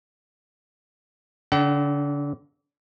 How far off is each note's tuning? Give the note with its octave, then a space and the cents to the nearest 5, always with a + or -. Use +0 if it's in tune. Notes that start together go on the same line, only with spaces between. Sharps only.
D3 -35 D4 +25 F#5 +45